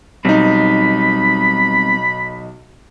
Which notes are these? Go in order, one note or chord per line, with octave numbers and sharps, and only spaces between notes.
B1 G3 B3 C4 D#4 B5